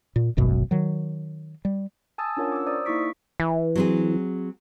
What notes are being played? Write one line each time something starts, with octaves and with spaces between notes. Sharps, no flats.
A#2
D#1 G#1 F#2 B2
D#3 F#3
G3
G#5 A5 D#6 E6 A6
C#4 D4 F4 A#4 C#5 F#5
D6 E6
C5 D5 A#5 D#6 E6 A6
A#3 D#4 E4 C#6 B6 D7
E3
F#3 C4 G#4